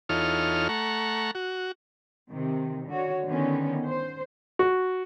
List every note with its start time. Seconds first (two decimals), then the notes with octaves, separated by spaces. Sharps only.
0.09 E2 D#4 F4 A4 C#5 F6
0.69 A3 F#5 A#5 C#6
1.35 F#4
2.31 C3 D#3
2.88 D3 F#4 C#5
3.25 D3 D#3 B3 C#4
3.87 C5
4.59 F#4